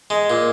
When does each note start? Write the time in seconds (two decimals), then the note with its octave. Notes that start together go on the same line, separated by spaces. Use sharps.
0.10 G#3
0.30 A#2